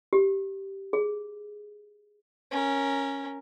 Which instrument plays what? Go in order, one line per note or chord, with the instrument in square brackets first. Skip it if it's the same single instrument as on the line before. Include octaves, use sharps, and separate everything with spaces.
[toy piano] G4
G#4
[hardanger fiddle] C#4 A#4